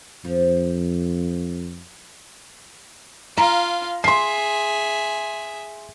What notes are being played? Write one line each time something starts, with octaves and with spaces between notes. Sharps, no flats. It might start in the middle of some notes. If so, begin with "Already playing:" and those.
F2 F3
F4 F5 A#5
G#4 E5 C6 C7